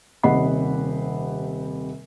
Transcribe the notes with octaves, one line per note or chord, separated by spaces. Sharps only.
D#1 C3 D#5 F#5 B5 C7